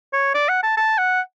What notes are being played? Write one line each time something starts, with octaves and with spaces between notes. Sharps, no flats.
C#5
D5
F#5
A5
A5
F#5